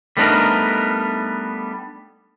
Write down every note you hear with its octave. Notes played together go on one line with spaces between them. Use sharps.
G3 A3 B3 D4 D#4 A#4